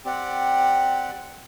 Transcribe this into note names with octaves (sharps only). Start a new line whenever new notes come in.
C4 G4 D5 F#5